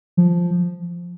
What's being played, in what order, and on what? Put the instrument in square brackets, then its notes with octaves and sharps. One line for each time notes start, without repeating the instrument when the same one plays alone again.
[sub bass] F3